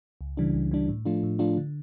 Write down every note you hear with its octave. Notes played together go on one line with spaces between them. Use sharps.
C#2
C#3 E3 G3 D4
C#2
C#3 E3 G3 D4
A2
F3 A3 D4 F4
A2
F3 A3 D4 F4
D3